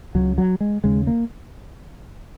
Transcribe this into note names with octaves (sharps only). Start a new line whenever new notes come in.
C#2 C#3 F#3
F#3
G#3
D#2 C#3 G#3
A#3